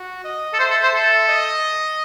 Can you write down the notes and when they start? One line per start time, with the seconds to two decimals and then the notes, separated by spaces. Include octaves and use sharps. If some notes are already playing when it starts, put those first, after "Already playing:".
Already playing: F#4
0.25 D#5
0.54 A4
0.59 C5 E5
0.71 A4
0.83 C5
0.94 A4
1.28 D#5